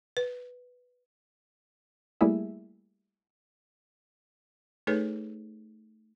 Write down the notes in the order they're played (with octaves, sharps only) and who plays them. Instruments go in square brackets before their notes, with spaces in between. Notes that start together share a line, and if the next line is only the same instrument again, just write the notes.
[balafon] B4
[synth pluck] G3 A3 A#3 E4 G#4 E5
[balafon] A3 D#4 G#4 A4 B4 C#5